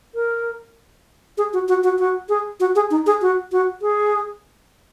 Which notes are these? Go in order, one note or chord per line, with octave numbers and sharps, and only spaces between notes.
A#4
G#4
F#4
F#4
F#4
F#4
G#4
F#4
G#4
D#4
G#4
F#4
F#4
G#4